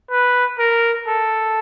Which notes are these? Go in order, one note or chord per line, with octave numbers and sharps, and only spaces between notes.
B4
A#4
A4